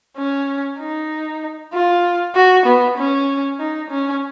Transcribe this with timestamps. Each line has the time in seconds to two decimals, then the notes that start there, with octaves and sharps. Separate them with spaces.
0.17 C#4
0.80 D#4
1.73 F4
2.35 F#4
2.66 B3
2.98 C#4
3.60 D#4
3.90 C#4